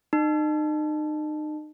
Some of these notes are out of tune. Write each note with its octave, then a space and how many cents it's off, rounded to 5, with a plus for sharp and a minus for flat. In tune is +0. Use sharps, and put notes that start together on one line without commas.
D#4 -35